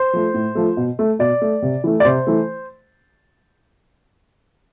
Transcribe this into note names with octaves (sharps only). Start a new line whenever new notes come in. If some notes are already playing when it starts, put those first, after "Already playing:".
Already playing: C5
F3 A3
A2
F3 A3
B2
A3
B2 D5
A3
C3
E3 A3
D5
C3 C5
E3 A3